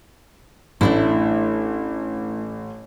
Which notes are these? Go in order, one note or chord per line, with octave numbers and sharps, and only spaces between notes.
A1 A3 D4 E4